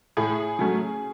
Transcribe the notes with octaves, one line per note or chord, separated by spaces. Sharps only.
A2 G#4
F#3 A3 C#4